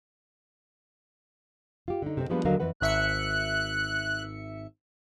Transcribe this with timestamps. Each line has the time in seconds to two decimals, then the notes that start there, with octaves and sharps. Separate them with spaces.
1.88 F4 G4
2.02 D3 D#4
2.17 C3 C4
2.30 F3 G3 G#3 B3 D4 F4
2.45 D#2 D3 F#3 A#4 D#5 F5
2.60 F2 E3 B4 F#5
2.81 G#1 E5 F#6 C#7